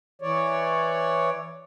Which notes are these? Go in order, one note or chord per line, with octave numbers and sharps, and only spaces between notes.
E3 C#5 D5